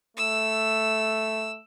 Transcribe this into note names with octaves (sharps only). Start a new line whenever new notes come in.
A3 E6